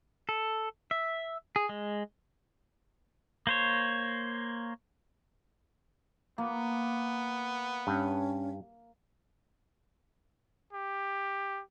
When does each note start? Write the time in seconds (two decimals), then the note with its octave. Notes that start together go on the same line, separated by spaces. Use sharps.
0.29 A4
0.91 E5
1.56 G#4
1.69 G#3
3.47 A#3 C5 C#5
6.38 A#3 B3
7.87 G2 C#4
10.73 G4